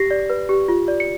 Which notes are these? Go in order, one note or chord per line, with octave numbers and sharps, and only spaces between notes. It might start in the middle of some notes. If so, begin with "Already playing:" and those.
Already playing: G4 A#6 C7
D5
B4
G4
F4
D5
C#7